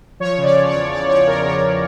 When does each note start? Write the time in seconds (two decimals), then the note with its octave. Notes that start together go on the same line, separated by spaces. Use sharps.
0.20 F3 C#5
0.38 C#3
0.43 D5
0.56 C#3
0.68 C#5
0.74 E2
0.91 E2 D5
1.09 F3 C#5
1.27 E2 A#4
1.45 C#3 C#5
1.63 C#3